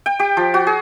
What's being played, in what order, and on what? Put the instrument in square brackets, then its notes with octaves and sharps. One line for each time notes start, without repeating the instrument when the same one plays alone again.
[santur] G5
G4
F3
F#4
G#4